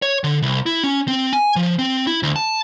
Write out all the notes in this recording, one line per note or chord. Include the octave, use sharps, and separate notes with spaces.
C#5
D3
C2
E4
C#4
C4
G#5
F3
C4
E4
D2
A5